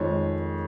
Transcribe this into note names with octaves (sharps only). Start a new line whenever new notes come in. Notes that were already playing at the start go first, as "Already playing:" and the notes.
Already playing: F2 D#3 G#3 C#5